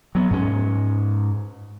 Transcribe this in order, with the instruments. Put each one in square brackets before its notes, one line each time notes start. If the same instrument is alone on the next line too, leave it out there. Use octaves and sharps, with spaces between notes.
[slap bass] F#3 B3
G#2 C#4